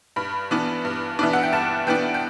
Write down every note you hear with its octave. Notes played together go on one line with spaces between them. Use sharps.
G2 B5
E3 B3 D4
G2
E3 B3 D4 E5
F#5
G5
G2 A5
E3 B3 D4 G5
G5